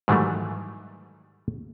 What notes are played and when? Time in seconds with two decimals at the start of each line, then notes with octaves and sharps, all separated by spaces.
0.08 G#2 D#3 E3 F#3 G3 A3